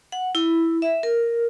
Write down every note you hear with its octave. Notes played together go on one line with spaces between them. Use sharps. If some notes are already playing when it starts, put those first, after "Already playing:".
F#5
E4
E5
A#4